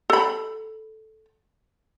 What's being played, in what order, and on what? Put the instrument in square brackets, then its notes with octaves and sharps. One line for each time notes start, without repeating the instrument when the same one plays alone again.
[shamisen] A4 B5